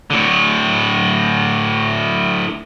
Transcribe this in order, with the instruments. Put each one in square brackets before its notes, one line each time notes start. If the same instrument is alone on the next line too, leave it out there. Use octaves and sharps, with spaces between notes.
[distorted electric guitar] A2 D3